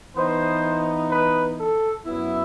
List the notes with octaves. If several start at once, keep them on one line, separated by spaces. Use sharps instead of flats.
E3 B3 D#4 C5
B4
A4
F#2 F#3 B3 E4